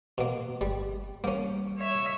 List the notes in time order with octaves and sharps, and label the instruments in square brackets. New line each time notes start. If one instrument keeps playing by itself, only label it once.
[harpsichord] B2 A#3
[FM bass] G1 [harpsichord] G3
[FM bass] G3 [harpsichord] A#3 C#4
[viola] C#5 E5